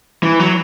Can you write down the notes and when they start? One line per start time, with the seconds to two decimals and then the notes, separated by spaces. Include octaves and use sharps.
0.23 E3
0.40 F#3